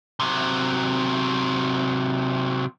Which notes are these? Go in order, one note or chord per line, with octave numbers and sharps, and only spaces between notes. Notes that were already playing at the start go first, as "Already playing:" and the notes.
C3 F#3